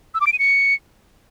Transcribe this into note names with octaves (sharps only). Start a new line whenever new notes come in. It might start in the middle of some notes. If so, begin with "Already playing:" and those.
E6
D6
D7
D#7
C#7